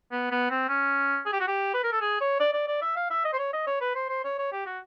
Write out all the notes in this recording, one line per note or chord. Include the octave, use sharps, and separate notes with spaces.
B3
B3
C4
C#4
G#4
G4
F#4
G4
B4
A#4
A4
G#4
C#5
D5
D5
D5
E5
F5
E5
D#5
C5
C#5
D#5
C#5
B4
C5
C5
C#5
C#5
G4
F#4